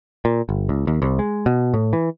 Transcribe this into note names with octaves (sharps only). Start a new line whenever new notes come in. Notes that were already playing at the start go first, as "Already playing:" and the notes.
A#2
G1
C#2
D#2
C2
G#3
B2
A2
E3